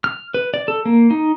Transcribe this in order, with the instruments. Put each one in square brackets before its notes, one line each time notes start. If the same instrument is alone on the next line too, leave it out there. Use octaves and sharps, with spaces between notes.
[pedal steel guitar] F6
B4
D5
A4
A#3
D#4